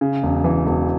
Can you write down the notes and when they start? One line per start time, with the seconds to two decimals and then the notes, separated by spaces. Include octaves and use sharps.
0.01 C#3
0.23 E1
0.44 E3
0.66 E1